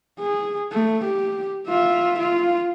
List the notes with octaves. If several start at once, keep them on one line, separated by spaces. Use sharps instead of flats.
G#4
A3
G4
F4 E5
F4